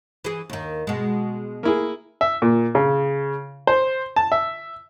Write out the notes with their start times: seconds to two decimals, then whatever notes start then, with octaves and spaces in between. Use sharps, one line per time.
0.24 E3 G#4
0.50 D#2 D#3
0.87 B2 G#3
1.63 A#3 E4 G#4
2.21 E5
2.42 A#2
2.75 C#3
3.67 C5
4.16 A5
4.32 E5